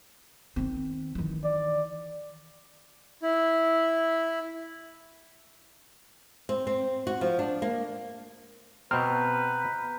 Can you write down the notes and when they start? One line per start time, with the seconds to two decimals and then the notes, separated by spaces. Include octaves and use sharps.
0.56 D#3 C4
1.15 D#3 E3
1.44 D5
3.22 E4
6.49 C4
6.67 C4
7.07 F#4
7.21 F3
7.39 D4
7.62 A#3
8.91 B2 C4 B4 A#5 F6 G6